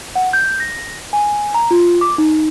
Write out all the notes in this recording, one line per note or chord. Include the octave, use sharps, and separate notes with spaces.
F#5
G6
A#6
G#5
A#5
F4
D6
D#4